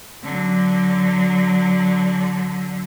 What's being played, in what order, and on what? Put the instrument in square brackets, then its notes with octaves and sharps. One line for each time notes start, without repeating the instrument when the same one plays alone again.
[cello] D3 F#3